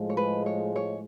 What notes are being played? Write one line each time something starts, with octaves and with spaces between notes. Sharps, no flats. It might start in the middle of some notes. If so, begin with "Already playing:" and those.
Already playing: A2 F3 G#3
C#5
B4
C#5
C#5